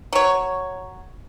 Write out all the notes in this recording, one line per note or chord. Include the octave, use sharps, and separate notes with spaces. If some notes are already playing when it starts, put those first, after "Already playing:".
F#3 C#5